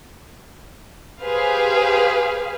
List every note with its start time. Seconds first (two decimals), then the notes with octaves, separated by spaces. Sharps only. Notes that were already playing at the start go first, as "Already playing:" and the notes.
1.24 G4 G#4 B4 C5 F5